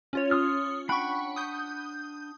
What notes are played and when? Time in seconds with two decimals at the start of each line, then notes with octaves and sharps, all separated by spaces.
0.13 C#4 F4 C#5
0.31 C6 D#6 F6
0.89 D4 F#5 G5 B5 C#6
1.36 D#6 G6